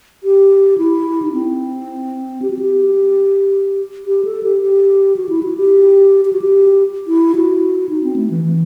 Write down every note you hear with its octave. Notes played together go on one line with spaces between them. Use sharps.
G4
E4
D#4
C4
G4
F#4
G4
G4
A4
G4
G4
F#4
E4
F#4
G4
G4
F#4
G4
E4
F#4
D#4
C4
A3
E3
E3